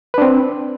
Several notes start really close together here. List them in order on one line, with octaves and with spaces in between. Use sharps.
B4 D4 C4